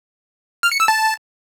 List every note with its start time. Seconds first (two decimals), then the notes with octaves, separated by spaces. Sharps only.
0.63 F6
0.72 C#7
0.80 E6
0.88 A5